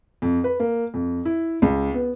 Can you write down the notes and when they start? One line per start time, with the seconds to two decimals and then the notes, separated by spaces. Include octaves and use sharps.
0.22 F2
0.44 B4
0.60 A#3
0.94 F2
1.25 E4
1.62 C#2
1.94 B3